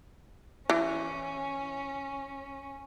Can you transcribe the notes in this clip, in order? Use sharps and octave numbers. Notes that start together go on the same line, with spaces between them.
E3 C#4